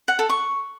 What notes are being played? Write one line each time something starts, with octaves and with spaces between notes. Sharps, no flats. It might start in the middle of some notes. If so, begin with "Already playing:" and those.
F#5
A4
C#6